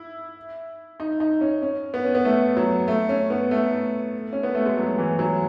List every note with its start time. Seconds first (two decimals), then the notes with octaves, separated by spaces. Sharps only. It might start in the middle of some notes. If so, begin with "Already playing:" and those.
Already playing: E4
1.00 D#4
1.20 D#4
1.41 C#4
1.62 C#4
1.94 B3
2.04 C#4
2.15 B3
2.25 A3
2.57 F#3
2.88 A3
3.09 C#4
3.30 B3
3.51 A3
4.33 C#4
4.43 B3
4.55 A3
4.65 G#3
4.77 F#3
4.98 E3
5.19 F#3